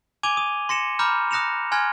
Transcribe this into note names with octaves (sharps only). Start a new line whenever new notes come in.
G#5 D6 G#6 D#7 F7 G7
D#6 D#7
C6 A#6 C#7 E7
A#5 B5 D6 F6 G6
D#6 F#6 A#6 C#7 E7 F7
G#5 C6 F6 F#6 G#6 A#6